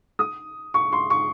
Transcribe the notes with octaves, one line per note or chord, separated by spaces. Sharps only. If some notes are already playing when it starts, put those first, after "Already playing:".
D#6
C#6
C6
C#6